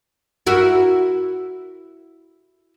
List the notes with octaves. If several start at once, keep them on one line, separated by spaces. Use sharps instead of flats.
E4 F#4 A#4